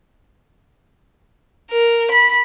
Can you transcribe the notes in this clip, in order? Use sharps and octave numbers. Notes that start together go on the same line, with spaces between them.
A#4
B5